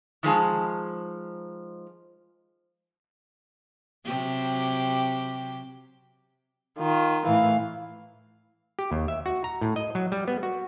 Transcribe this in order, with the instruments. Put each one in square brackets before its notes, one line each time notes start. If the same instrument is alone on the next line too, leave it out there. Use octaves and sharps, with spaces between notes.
[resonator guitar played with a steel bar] D#3 F3 G#3 A5
[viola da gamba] C3 F#3 G4
[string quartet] D#3 F4
A2 E3 F5
[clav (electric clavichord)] G4
D#2
E5
F#4
A#5
A2
D#5
F#3
G3
B3
F#4